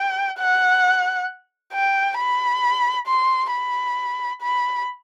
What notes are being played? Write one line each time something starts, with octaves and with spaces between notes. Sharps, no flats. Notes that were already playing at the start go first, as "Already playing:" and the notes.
Already playing: G5
F#5
G5
B5
C6
B5
B5